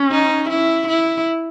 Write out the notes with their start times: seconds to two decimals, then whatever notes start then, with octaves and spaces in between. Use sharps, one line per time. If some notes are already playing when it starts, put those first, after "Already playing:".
Already playing: C#4
0.11 D#4
0.49 E4
0.88 E4